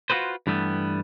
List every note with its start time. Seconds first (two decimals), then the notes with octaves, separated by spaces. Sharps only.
0.10 F4 F#4 G#4 B4 C5
0.47 G2 E3 G3 A3 B3